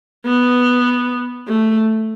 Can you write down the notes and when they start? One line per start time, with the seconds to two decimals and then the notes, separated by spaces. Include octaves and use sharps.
0.26 B3
1.47 A3